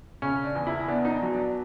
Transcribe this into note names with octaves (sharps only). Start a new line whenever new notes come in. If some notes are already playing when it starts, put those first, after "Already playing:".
C#3 C#4
D4
E2
E4
B3 D4
D#4
D4
F#3
D4